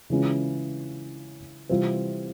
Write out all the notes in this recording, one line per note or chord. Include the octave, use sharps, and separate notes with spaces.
C#3 E3 G#3 C#4 F4
C3 E3 G3 C4 F4